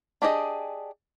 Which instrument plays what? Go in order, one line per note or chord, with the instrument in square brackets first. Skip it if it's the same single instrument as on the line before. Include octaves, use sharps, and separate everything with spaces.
[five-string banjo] D4 G4 G#4 D#5